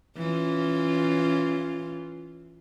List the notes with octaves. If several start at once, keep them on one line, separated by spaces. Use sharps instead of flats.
E3 C#4 F4